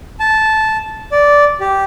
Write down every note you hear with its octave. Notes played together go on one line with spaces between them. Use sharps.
A5
D5
G4